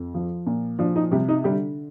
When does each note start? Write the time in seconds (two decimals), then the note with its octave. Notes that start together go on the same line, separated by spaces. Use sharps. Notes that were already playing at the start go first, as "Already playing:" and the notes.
Already playing: F2
0.14 F3
0.46 A#2
0.79 F3 D4
0.96 D#4
1.11 C3 G3 G4
1.29 D#4
1.44 D3 G3 G4